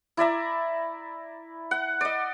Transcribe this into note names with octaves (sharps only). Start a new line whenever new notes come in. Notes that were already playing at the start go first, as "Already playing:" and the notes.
E4 D5 E5 A#5
F#5
D5 D#5